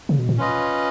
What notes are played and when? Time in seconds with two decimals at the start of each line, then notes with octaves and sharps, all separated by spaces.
0.09 C#3
0.19 B2
0.29 A#2
0.38 C#4 F4 B4 D#5